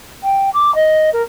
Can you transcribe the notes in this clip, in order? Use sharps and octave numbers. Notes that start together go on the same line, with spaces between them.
G5
D6
D#5
A#4